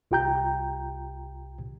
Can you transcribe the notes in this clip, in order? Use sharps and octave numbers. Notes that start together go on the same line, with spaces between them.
C2 F4 G4 G5 A#5 G6